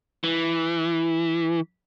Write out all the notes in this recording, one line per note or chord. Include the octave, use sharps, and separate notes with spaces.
E3